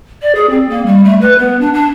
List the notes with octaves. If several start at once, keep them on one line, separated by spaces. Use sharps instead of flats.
D5
G#4
C4
A#3
G3
A3
B4
B3
D4
D4